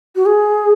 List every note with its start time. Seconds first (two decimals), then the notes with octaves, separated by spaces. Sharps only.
0.16 F#4
0.26 G#4